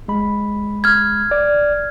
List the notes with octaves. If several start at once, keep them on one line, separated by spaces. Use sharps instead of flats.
G#3 B5
F6 G#6
D5